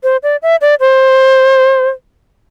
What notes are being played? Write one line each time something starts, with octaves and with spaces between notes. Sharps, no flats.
C5
D5
E5
D5
C5